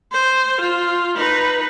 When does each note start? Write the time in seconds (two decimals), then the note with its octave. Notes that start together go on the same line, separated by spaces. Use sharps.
0.12 C5
0.61 F4
1.16 D#4 B4